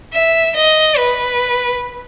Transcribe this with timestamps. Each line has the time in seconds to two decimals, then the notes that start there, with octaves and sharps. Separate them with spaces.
0.13 E5
0.56 D#5
0.97 B4